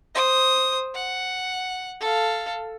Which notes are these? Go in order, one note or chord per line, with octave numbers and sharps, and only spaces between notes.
C5 D#6
F#5
A4 F5